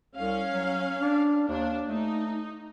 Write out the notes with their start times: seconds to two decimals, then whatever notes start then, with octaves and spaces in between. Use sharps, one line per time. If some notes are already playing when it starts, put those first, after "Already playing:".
0.17 C2 C#4 F5
0.51 F#3
1.01 D4
1.48 D#2 D4
1.89 A3 D#4